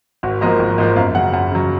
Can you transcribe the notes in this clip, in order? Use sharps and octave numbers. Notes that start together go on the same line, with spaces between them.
G#1 F#4
G#2 F3 A#3 D#5
G#1
G#2 F3 A#3
F#2 F5
C#3 F#3 F#5
F#2 F#5
C#3 F#3